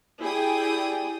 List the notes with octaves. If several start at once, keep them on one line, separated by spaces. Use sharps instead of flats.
E4 G4 G#4 D5 G5 D#6